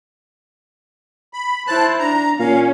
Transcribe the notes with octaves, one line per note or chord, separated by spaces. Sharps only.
B5
E4 C5 A5 F#6
D4 A#5
A#2 C#4 F5